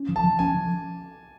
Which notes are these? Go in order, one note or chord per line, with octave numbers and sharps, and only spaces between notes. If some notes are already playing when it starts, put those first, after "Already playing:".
Already playing: C#4
F3
A5
F3
C#4 G#5
F3